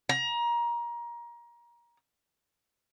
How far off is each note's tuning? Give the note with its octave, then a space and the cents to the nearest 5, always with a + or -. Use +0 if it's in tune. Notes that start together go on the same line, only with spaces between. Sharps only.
A#5 +25